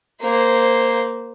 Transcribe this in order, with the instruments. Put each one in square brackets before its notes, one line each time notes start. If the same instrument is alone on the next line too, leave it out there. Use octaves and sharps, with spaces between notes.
[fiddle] A#3 C5